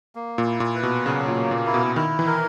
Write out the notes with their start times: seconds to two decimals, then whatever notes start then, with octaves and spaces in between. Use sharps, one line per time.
0.15 A#3
0.38 A#2
0.46 E4
0.60 A#2
0.75 B4
0.83 B2
1.06 C#3 F#3
1.28 A#2
1.36 A#3
1.51 A#2
1.67 E4
1.74 B2
1.96 D#3 E4
2.19 E3
2.27 A#4